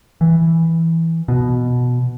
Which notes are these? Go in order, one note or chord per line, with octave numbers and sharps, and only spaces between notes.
E3
B2